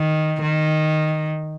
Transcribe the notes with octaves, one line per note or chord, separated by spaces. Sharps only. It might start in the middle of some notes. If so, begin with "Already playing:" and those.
Already playing: D#3
D#3